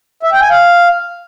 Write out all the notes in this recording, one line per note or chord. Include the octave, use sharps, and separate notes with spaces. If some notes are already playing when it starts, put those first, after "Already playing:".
E5
G5
G#5
F5